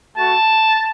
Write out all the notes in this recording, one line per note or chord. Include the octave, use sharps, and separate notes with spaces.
A3 F#4 A5